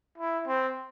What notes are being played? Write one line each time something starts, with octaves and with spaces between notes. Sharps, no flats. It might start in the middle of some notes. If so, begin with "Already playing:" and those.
E4
C4